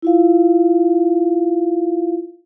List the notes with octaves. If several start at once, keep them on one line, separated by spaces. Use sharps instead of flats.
E4 F4 F5